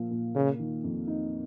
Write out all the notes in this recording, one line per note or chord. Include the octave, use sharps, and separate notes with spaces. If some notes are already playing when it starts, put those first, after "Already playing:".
Already playing: A#2 F3 A#3
A#2
C#3 A#3
D#3
F2
D#4